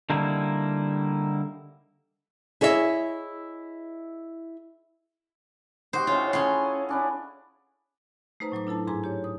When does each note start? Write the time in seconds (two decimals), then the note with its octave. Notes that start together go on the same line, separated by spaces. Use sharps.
0.10 D3 G3 A#3 D#4 E4
2.61 E4 G#4 C#5 D#5 E5
5.93 D#4 F#4 G4 C5
6.07 A2 C#4 F4 C#5
6.33 C#4 E4 G#4 A4 C6
6.89 C#4 D4 E4
8.40 A3 D#4 B4 C5 A#5
8.52 A2 F#3 A#5 D6
8.67 D4 E4 A4 A5
8.87 G#2 G#4 G#5 A#5 D6
9.04 G4 C#5
9.24 D#6